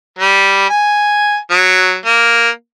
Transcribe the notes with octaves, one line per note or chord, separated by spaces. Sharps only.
G3
G#5
F#3
A#3